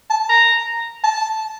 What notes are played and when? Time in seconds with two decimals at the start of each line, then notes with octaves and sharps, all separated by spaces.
0.10 A5
0.29 A#5
1.04 A5